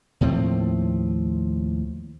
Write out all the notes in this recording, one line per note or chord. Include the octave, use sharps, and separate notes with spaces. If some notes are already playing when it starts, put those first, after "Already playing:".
D#2 A2 F3 C4